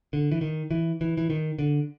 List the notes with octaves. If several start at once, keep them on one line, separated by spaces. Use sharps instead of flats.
D3
E3
D#3
E3
E3
E3
D#3
D3